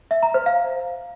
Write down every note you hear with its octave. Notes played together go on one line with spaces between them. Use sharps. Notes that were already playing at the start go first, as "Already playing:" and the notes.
E5
A#5
C5
F5